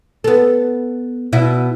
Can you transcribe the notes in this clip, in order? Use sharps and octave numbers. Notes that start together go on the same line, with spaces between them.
B3 A4
B2 E4